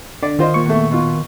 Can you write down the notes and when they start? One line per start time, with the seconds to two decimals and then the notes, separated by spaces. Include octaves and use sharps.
0.23 D3 D5
0.39 D#3 F4 C5 D#5
0.54 A#2 C#6
0.66 E2 A3
0.91 B2 F4